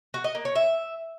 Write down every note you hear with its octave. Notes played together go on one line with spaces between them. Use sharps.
F#4
D#5
A#3
C#5
E5